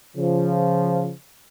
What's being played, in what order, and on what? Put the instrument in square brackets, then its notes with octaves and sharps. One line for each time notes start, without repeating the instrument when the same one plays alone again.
[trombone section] C#3 F3